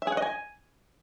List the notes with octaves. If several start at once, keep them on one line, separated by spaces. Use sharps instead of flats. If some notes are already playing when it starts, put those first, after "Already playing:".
E5
G#4
F#5
D#5
G#5